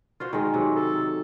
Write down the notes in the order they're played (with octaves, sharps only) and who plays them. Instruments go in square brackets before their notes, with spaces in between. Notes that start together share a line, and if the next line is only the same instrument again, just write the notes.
[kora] F4 F#4 C5
D#3 G#3
C3 F#3
[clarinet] A4